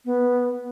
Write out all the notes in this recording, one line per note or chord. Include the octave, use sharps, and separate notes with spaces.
B3